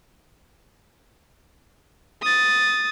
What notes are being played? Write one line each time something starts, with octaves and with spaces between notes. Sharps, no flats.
D#6 A6